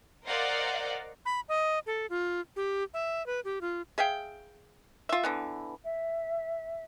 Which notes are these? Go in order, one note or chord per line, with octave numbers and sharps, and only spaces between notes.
A#4 C5 D5 D#5 F5 F#5
B5
D#5
A4
F4
G4
E5
B4
G4
F4
G#4 E5 F5 G5
F4 E5
D3 E3 B3
E5